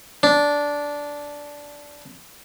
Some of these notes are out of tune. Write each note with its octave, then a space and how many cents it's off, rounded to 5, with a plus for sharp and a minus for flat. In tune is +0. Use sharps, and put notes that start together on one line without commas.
D4 -10